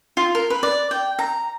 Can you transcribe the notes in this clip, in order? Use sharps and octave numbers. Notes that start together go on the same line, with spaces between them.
F4
A#4
B4
D5
G5
A#5